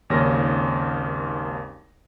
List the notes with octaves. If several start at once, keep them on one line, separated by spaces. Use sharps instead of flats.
G#1 D#2 C#3 C#4 A#6